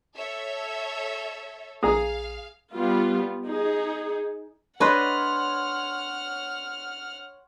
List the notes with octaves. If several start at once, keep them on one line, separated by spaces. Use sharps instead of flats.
A4 C#5 E5
A#1 G#4 F5 A#5 D#6
G3 B3 F4
D#4 G#4
D4 B4 C#5 D#5 F#5 C6 F6